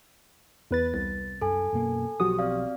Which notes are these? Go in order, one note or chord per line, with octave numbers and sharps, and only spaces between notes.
E2 B4 A6
C2 A6
F#2 A4 G#5
F#2 B2 A#3
B1 F3 F#3 F#4 G4 D#6
C4 D5 F5